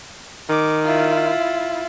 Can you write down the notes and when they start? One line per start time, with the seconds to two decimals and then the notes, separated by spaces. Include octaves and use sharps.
0.49 D#3 D6
0.84 E4 F4